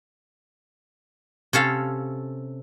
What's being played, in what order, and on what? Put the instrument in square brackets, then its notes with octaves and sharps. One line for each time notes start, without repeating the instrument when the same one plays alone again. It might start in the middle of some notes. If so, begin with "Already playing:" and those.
[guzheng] C3 C#4 A4 F5